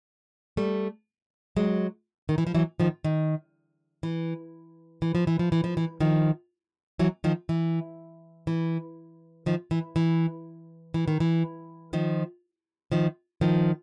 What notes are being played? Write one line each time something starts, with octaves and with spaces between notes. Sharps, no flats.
G3 A3
F#3 G#3
D#3
E3
F3
E3 F#3
D#3 F3
D#3
E3
E3
F3
E3
F3
E3
F3
E3
D#3 F3
E3 F#3
D#3 F3
E3
E3
D#3 F3
E3
E3
E3
D#3
E3
D#3 F3
D#3 F3
D#3 F3